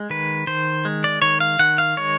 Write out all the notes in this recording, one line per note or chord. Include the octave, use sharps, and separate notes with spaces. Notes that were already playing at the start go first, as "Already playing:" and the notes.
Already playing: G#3
D#3 B4
D#3 C5
G#3
D5
D#3 C#5
F5
D#3 F#5
F5
G#3 C#5